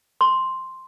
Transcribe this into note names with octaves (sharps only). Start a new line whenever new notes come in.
C6